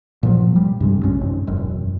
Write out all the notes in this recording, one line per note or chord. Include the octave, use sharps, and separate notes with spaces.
A#2 F3 F#3
G3
G2 C3 G#3
A#1 F#2 G#3 C#4
G#1
E1 F#2